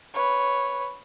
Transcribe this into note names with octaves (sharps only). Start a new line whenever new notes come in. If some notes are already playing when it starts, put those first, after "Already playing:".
B4 C#5